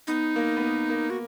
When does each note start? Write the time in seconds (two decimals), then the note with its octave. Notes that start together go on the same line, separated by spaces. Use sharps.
0.07 B3 D#4
0.36 A#3
0.57 B3
0.62 A#3
0.90 A#3
1.10 F#4